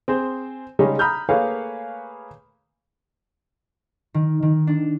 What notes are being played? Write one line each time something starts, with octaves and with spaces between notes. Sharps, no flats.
C4 G#4 C5
C#3 G3 G#3 C#4 D#4
A#5 B5 D#6 F6 G6
A3 A#3 G#4 B4 C#5 F5
D#3
D#3
D4